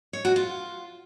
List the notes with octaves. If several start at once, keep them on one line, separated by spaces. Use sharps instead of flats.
C#5
F#4
F4